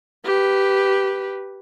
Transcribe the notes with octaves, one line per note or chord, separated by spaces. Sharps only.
G4 B4